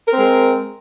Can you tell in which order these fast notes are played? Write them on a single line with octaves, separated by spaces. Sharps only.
A#4 C4 G#3